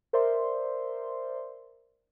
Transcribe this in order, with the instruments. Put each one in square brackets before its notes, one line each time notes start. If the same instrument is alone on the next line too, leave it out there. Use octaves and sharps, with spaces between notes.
[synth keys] A#4 C5 D5 E5 C6